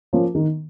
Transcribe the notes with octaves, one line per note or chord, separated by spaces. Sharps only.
F3 A#3 C#4
D#3